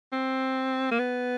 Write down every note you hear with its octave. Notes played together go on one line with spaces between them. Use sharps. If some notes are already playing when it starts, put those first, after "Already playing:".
C4
A#3
B3